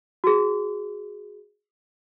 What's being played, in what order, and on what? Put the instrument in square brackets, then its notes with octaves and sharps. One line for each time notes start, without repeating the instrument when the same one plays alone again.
[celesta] F#4 G#4